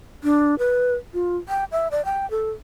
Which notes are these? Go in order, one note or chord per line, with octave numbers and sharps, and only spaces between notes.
D4
B4
F4
G5
E5
D5
G5
A4